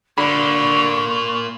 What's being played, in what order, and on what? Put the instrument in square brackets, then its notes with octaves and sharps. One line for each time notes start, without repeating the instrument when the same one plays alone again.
[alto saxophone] D3 [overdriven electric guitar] A#3 F4 [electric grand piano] B5 [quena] C#6